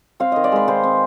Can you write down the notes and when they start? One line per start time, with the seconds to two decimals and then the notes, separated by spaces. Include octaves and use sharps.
0.20 C4 F5
0.32 D#3 D#5
0.44 D5
0.52 G#3 B4
0.68 D#3 C5
0.83 C4